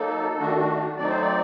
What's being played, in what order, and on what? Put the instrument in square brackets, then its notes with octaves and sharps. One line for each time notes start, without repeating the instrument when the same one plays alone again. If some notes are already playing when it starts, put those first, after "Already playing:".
Already playing: [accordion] F#3 A#3 D#4 A4
D#3 A3 D4 F#4
F#4
F#3 A3 C4 D#4 D5
C5
D5